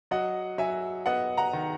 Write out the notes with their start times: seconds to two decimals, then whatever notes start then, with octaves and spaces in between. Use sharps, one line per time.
0.11 F#3 D#5 F#5
0.58 F#3 E5 G#5
1.06 B3 D#5 F#5
1.37 F#5 A#5
1.53 D#3